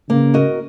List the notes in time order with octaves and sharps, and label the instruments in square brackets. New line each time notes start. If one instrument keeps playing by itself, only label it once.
[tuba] C#3 [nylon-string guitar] A#3
[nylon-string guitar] F#4 A#4 D#5